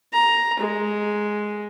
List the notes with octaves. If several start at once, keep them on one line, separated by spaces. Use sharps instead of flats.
A#5
G#3